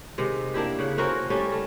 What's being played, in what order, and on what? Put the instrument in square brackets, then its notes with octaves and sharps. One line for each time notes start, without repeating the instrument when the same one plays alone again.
[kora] C3 D#3 G#3
A#3 D4 E4 G4
C#3 F#5
C#4 F#4 A#4 C5
G3 A3 C#4
A3